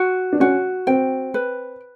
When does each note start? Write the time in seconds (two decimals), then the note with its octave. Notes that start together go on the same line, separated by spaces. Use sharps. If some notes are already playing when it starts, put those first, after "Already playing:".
Already playing: F#4
0.33 D4
0.40 C#4 F#4
0.87 C4 G5
1.34 B4